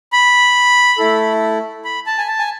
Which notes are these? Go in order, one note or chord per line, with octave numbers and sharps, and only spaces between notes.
B5
A3 E4 A4
B5
A5
G#5
A5
G#5